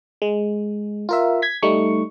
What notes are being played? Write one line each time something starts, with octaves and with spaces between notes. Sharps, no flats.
G#3
F4 A#4 E5
G#6 B6
G3 A3 D#4 C#6